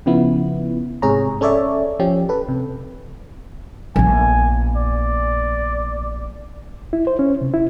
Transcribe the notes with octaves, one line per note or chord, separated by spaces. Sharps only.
C#3 F3 B3 E4
G#2 C3 G#4 C#5 A#5
C#4 A4 C#5 D5 E5
F3 C#4 G4
A4 B4
C3
A#1 B3 G#5
D5
E4
C5
C#4
C3
E4